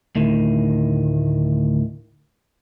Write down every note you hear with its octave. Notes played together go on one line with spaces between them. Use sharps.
D2 A2 D#3